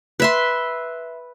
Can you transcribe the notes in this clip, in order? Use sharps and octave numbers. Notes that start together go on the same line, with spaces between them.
B4 E5 C6